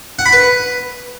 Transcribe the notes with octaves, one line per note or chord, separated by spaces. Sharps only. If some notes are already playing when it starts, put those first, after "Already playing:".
F#5
B5
B4